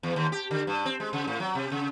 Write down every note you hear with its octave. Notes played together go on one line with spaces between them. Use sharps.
E2
D#2
G4
D3
G2
C4
G#3
C#3
A2
F#3
C3
C#3